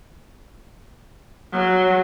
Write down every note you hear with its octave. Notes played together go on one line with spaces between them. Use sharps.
F#3